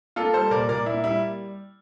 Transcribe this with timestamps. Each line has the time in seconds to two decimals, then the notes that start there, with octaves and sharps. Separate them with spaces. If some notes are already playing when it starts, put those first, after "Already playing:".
0.16 A#3 F4 A4
0.33 G3 A4 C5
0.51 A#2 A#4 D5
0.69 A#2 A#4 D5
0.86 A#3 E4
1.04 G3 E4